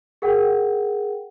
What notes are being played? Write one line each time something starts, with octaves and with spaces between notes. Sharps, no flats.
G#4 A#4 F#5 G5